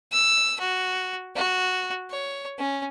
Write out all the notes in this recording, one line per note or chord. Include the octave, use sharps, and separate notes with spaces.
E6
F#4
F#4
C#5
C#4